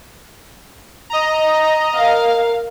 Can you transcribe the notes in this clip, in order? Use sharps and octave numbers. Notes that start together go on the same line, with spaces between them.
D#5 A#5
A#4 F5